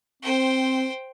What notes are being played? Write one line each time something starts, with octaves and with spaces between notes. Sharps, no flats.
C4 C5 G5